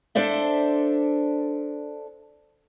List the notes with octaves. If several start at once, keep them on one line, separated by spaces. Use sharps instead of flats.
D4 A4 C5 D5 E5